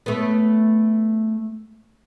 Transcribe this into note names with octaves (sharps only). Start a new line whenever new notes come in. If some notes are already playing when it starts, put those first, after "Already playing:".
A3 B3